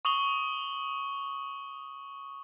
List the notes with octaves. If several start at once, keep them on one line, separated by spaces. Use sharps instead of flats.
C#6 D#6 F#7 G7